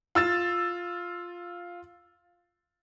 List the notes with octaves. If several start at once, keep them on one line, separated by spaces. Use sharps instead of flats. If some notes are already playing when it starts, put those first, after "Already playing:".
F4 E6 A6